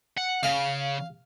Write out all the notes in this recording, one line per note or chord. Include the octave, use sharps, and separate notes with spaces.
F#5
C#3 F5